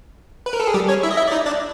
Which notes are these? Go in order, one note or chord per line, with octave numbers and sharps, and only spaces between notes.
B4
A#4
A4
G#4
G3 G4
C#4 C#5
E4 E5
D#5
E4 E5
D5
D#4 D#5
D4 D5